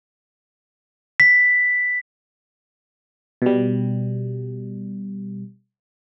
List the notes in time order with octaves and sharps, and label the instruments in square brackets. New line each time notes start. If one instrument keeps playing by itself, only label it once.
[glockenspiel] B6
[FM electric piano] B2 G3